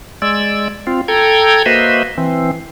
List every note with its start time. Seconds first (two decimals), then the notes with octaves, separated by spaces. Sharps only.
0.22 G#3 D5 E6
0.87 C4 F4
1.08 A4 G5 A#5 G#6
1.66 A#3 F#4 B4 C5 D#5 E5
2.18 E3 C4